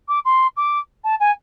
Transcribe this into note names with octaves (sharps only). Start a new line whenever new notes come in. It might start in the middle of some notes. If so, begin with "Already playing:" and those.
D6
C6
D6
A5
G#5